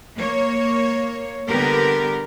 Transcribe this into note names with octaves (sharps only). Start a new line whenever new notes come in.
A#3 C#5
D3 G3 B3 G4 A#4